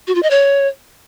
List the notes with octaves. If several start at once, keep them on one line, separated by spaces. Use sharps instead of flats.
F#4
F4
D#5
C#5